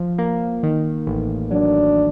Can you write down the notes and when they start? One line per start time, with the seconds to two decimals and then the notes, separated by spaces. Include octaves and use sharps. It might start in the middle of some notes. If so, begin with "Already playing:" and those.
Already playing: F3
0.18 A#3
0.63 D#3
1.07 A1
1.51 F#3 D4